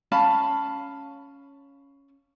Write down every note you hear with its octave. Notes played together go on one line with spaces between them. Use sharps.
C#4 F5 A5 B5